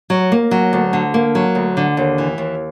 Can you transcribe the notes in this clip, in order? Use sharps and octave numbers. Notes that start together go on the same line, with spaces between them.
F#3
A#3
F#3
D2
D3
A#3
F#3
D2
D3
D#2
E3
D#2